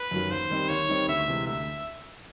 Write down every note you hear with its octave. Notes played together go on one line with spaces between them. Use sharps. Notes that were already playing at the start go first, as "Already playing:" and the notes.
Already playing: B4
F#2 D#3 F#3
D#2 C5
D#3 G3 C4 D#4
D#2 C#5
D#3 G3 C4 D#4
D2 E5
C3 E3 G#3
D2 E5